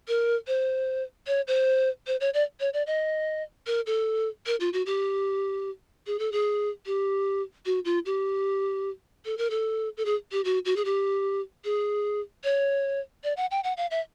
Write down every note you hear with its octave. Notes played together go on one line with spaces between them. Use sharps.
A#4
C5
C#5
C5
C5
C#5
D5
C#5
D5
D#5
A#4
A4
A#4
F4
F#4
G4
G#4
A4
G#4
G4
F#4
F4
G4
A4
A#4
A4
A4
G#4
G4
F#4
F#4
G#4
G4
G#4
C#5
D5
F#5
G5
F#5
F5
E5